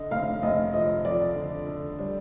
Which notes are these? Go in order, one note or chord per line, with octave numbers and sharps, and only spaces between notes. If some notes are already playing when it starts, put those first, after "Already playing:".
Already playing: D3 D#5
F1 F5
F1 D#5
F3 D#5
F2 D5
D3
D3
G3